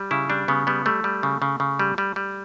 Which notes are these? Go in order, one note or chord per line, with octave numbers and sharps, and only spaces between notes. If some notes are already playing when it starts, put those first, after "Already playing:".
Already playing: G3
C#3 E4
G3 D4
C#3 B3
G3 B3
G3 A3
G3
C#3
C#3
C#3
G3
G3
G3